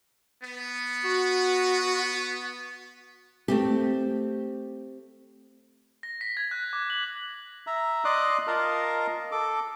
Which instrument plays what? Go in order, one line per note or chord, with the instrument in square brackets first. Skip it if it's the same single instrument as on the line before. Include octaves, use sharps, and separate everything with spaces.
[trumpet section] B3
[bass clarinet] F#4
[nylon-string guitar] A3 C4 G4
[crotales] A#6
B6
G#6
F#6
D6
F#7
[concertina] E5 A#5
D5 D#5 C6 D6 D#6 F#6
F4 A#4 D#5 F5 A5 A#5
A4 D6